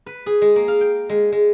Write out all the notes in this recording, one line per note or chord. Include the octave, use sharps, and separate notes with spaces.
B4
G#4
G#3
A#3
F5
G5
G#3
G#3